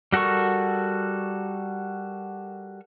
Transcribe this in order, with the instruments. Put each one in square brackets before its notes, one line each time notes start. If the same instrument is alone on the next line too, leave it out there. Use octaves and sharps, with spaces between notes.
[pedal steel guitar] G3 F#4 A4 A#4 C#6